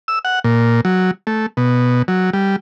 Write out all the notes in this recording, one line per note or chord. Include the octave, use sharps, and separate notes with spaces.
E6
F#5
A#2
F#3
A3
B2
F#3
G3